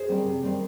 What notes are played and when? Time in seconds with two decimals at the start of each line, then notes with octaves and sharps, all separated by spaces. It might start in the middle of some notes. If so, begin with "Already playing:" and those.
Already playing: G#4 C5
0.08 D#3 G3 C4
0.25 C3
0.43 D#3 G3 C4